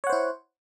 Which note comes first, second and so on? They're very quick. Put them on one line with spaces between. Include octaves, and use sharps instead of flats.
C#5 F#5 C5 E4